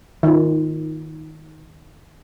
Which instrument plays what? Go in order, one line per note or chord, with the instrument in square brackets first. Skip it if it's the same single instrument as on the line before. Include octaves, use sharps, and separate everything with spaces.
[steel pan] D#3 F4